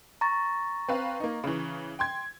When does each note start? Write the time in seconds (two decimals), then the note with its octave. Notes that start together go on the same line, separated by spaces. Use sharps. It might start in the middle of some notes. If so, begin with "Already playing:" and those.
0.21 A#5 C#6 A6
0.89 C4 B4 F5
1.20 A#3 D#4
1.44 C#3 E3
1.99 G5 C6 G#6